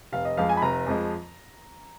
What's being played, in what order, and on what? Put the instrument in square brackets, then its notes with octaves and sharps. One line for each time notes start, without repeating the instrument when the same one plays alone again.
[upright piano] F1 F5
D#5
F2 F3 G#3 F5
G#5
B5
F1 A#5
F2 F3 G#3